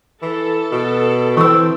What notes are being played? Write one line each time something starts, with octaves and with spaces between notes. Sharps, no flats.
E3 A4
B2
E3 C4 C#6 E6